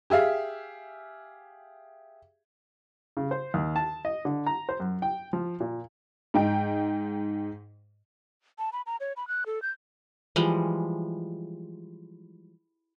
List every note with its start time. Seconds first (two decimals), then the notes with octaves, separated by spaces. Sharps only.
0.10 G4 G#4 E5 F5
3.17 C#3
3.31 C5
3.54 D#2
3.76 A5
4.05 D#5
4.25 D3
4.46 A#5
4.69 C5
4.80 F#2
5.02 G5
5.33 F3
5.60 A#2
6.34 G#2 D#4 G5
8.59 A5
8.73 B5
8.86 A#5
9.00 C#5
9.17 B5
9.28 F#6
9.46 A4
9.62 G6
10.36 E3 F3 G3 G#3